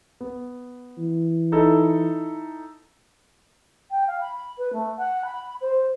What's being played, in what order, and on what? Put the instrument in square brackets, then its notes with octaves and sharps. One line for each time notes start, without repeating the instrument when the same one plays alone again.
[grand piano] B3
[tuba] E3
[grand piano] D#4 E4 A4
[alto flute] G5
F5
B5
B4
A3
F#5
B5
C5